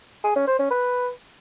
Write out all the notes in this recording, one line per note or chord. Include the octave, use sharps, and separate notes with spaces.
G#4
C#4
C5
C#4
B4